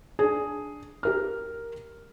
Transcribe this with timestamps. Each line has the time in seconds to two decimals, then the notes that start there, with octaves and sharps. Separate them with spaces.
0.19 D4 G#4
1.03 G4 A#4 F6